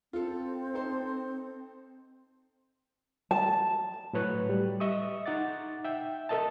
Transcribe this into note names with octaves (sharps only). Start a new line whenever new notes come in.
C4 F4 A4
D#4 A4 C5
A5
A2 F#3 B4 C#5 F#6
G3
D#5 E5 C#6 D#6
D#4 F#5 D6 A6
E5 G5
A4 A#4 D#5 E5 A5